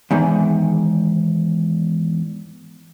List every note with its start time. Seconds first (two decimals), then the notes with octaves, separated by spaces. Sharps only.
0.11 E2 G#2 D#3